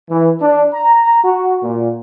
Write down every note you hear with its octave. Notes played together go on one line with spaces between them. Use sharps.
E3
D4
A#5
F#4
A#2